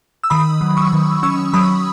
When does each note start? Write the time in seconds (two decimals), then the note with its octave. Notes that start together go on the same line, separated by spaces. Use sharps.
0.24 E6
0.30 D#3 B5 D#6
0.61 F#3
0.77 C#6 E6
0.92 D#3
1.23 C#4 C#6 E6
1.53 F#3 B5 D#6